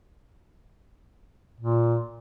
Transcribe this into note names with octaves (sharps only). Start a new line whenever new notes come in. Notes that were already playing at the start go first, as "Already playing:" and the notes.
A#2